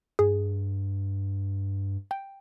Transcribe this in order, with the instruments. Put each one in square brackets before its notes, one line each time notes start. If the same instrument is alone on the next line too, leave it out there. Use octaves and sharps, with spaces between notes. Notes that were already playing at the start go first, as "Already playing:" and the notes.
[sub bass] G2 [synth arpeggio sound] G#4
[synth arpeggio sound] G5